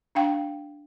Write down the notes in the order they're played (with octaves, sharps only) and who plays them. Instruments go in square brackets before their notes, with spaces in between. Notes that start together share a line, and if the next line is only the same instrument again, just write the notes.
[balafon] D4 F5 G5